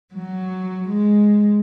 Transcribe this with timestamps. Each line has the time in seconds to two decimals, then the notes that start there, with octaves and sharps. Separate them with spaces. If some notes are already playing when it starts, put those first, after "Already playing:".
0.14 F#3
0.87 G#3